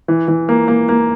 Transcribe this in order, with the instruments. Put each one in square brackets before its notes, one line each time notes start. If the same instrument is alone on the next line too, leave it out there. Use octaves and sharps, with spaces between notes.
[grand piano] E3
E3
A#3
A#3
A#3